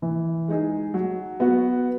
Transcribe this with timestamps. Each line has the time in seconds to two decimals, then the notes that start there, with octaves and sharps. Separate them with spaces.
0.02 E3
0.48 G#3 D#4 G#4
0.94 F#3
1.40 B3 F#4